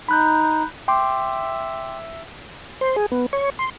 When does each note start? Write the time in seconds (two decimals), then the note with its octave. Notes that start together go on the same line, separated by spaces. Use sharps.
0.09 D#4 B5 F#6 G6
0.88 E5 G5 C6 D6
2.81 C5
2.96 G#4
3.12 B3
3.33 C#5
3.59 C6